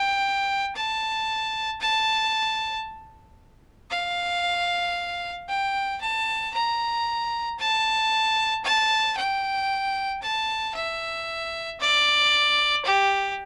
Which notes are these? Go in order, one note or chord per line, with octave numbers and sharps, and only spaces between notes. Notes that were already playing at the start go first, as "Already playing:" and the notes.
Already playing: G5
A5
A5
F5
G5
A5
A#5
A5
A5
G5
A5
E5
D5
G4